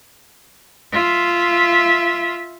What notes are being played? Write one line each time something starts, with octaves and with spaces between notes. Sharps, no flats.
F4 E5